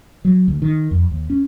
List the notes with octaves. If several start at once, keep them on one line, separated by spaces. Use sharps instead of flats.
F#3
D2
D#3
F2
D#2
C#4